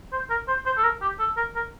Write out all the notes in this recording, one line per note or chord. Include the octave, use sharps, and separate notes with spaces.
C5
A#4
C5
C5
A4
A#4
G4
A4
A#4
A#4